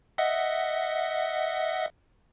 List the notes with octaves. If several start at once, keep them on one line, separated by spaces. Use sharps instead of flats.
D#5 E5 F#5